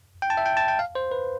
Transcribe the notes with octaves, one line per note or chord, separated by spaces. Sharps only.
G5
A5
E5
G5
A5
G5
F5
C5
B4